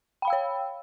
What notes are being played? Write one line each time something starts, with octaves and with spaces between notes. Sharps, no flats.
C#5 F5 G5 B5 E6